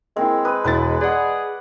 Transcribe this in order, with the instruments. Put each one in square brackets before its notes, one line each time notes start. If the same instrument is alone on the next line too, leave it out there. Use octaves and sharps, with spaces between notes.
[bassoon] G#3 [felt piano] A#3 E4 [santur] C4
[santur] B4 [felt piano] D#6
[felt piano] E1 E4 A6 [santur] B4
[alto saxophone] G#4 [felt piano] D5 F#5